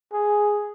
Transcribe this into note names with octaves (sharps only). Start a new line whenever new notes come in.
G#4